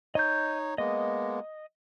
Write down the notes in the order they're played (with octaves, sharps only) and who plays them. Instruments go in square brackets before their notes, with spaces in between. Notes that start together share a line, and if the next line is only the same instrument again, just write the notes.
[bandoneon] D#4 C#5 [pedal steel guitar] D#5 G6
[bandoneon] G#3 A#3 B3 [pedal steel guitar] D#5